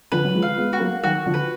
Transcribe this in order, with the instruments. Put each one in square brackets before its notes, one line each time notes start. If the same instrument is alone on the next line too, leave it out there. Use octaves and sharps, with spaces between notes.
[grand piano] D3 F3 [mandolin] B4
[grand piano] F#3
F3 G#3
[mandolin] F5
[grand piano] G#3 B3
[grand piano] B3 [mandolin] F#4
[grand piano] F#3 A#3
[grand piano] D#3 F#3 [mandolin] F#4
[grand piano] D3 F3
[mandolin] B4